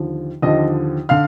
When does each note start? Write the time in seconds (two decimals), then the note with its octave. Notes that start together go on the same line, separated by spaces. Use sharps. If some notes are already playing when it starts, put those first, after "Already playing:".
Already playing: D#2 D3 F3
0.42 D#2 D3 F3 D#5 D#6
1.09 D3 F5 F6